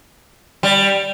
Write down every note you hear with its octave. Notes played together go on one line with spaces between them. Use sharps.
G3